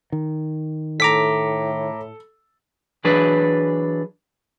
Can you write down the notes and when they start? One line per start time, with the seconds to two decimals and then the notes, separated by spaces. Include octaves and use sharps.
0.12 D#3
1.00 A2 A4 A#5 D6 B6
3.04 E3 F#3 D4 G#4 B4